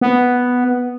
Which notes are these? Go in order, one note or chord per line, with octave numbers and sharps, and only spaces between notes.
B3